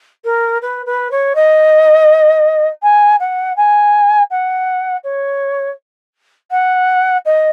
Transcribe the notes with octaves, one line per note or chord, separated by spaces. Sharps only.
A#4
B4
B4
C#5
D#5
G#5
F#5
G#5
F#5
C#5
F#5
D#5